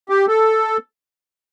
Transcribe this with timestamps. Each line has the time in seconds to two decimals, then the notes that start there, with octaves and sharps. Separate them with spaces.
0.09 G4
0.28 A4